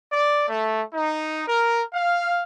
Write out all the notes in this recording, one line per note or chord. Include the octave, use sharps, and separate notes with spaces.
D5
A3
D#4
A#4
F5